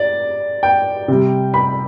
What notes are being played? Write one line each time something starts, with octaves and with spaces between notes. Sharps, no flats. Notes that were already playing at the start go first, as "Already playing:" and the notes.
Already playing: D5
G5
C3 G3
B5